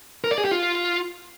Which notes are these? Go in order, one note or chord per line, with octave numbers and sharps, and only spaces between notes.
A#4
D5
G#4
G4
F4